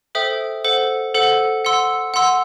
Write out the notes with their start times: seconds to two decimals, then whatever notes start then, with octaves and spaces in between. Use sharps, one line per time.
0.15 A4 C5 E5 G5 D#6
0.64 A4 C5 F#5
1.15 A4 C5 F#5
1.65 F#5 C6 E6
2.14 F#5 C6 E6